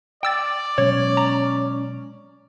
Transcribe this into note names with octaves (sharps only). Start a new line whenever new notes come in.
D5 G5 E6 A6
B2 F#3 G#3 C#4 C#5
A#5